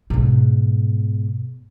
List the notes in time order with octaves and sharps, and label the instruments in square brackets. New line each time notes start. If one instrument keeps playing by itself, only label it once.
[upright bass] G#2 B2